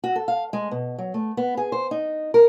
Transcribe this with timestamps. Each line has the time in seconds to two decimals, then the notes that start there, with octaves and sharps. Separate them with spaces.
0.04 F#4
0.16 A4
0.28 F5
0.53 G#3
0.71 B2
0.98 F#3
1.14 A3
1.37 B3
1.57 G#4
1.72 C5
1.91 D#4
2.34 A#4